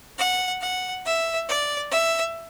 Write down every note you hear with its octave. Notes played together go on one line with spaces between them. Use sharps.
F#5
F#5
E5
D5
E5